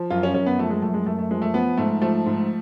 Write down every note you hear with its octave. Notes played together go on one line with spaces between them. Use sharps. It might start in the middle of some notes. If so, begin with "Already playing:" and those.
Already playing: F3
F#2 F4
C#4
F#2 C#4
B3
F3 A3
G#3
F#2 A3
G#3
F#2 A3
A3
F3 G#3
A3
F3 B3
G#2 A3
F3 A3
G#2